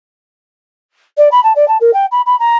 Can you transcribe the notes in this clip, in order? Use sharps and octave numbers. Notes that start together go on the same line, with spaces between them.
D5
B5
A5
D5
A5
A#4
G5
B5
B5
A#5